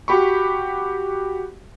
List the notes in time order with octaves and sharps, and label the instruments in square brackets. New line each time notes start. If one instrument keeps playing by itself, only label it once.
[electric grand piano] F#4 G4 B5 C#6